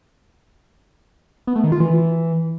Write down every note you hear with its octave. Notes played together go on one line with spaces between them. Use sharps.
B3
A3
D#3
F4
E3